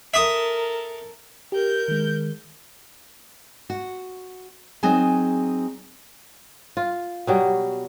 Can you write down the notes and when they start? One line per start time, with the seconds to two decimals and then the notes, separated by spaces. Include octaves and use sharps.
0.14 A4 A#4 E5 D#6
1.52 G4 A#4 G6
1.88 D#3 G#3
3.70 F#4
4.83 F#3 C4 D#4 G#4 G#5
6.77 F4
7.27 B2 F#3 G3